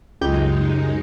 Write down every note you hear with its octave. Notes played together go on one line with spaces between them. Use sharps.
C#2 F#2 G#3 D#4 G4 G6